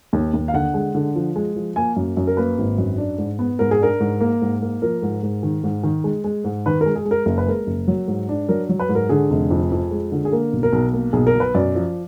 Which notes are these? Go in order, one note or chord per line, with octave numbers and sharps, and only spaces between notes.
D#2
D#2
F5
D3 F#5
G#3
D3
F3
G#3
F3
A#3 G#5
F#2
F#2
A#4
A#3 B4
G#1
F#2
D4
G#2
B3
G#2 A#4
G#4
D4 A#4
G#2
A#3
G#2
A#3
F3 A#4
G#2
G#2
D#3
G#2
D#3
G#3
G#3
G#2
D#3 B4
G#3 A#4
G#4
G#3
A#4
F#1 A#4
B4
G#3 A#4
F#1
F#3
G#2
D4
F#3 A#4
F#3
B4
G#2
A#4
D3 G#4
F1
F2
F2
G#3
D3
G#4
A#3 A#4
B1
A#4
B1
A#3
B1 G#4
A#4
B2
B4
F#2 D5
F3